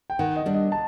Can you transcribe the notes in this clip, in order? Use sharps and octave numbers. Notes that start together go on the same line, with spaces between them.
G5
D#3 F#5
D#5
G3 D4
D#5
A5